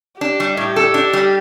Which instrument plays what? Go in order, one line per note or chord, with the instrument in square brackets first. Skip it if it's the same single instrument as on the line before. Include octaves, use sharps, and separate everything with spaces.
[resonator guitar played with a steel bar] D4 [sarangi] G4
[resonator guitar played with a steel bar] G3
A2
A4
D4
G3